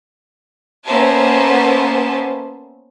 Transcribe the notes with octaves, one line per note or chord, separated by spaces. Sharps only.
A#3 B3 C#4 C5 E5 A5